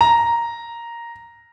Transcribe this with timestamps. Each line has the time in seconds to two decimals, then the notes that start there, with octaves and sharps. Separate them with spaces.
0.01 A#5